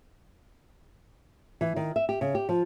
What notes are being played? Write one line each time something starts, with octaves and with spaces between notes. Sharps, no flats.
E3
D#3
E5
G4
C#3
G4
F3